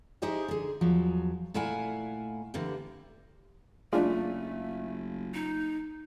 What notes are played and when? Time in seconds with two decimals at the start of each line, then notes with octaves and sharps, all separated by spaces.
0.22 D#4 E4 G4 G#4 C5 D#5
0.48 D3 G#4
0.81 E2 F3 F#3
1.54 A#2 A3 E4 F5 F#5 G#5
2.54 D3 E3 A#3 G4
3.93 F#1 G#3 A3 D4 F4
5.34 D#4